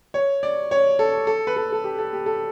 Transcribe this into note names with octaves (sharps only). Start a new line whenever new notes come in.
C#5
D5
C#5
A4
A4
B4
A4
A4
G4
A4
G4
A4